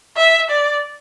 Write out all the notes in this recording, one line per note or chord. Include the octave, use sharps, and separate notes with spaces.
E5
D5